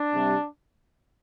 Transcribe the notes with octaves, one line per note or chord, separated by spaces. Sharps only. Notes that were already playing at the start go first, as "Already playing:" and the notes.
Already playing: D4
C3 G3